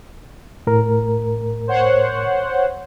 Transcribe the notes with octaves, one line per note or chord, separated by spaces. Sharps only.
A2 A#4
C5 C#5 F#5